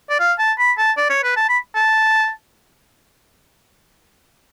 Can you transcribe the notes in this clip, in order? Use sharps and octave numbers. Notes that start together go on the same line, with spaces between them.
D5
F5
A5
B5
A5
D5
C#5
B4
A5
B5
A5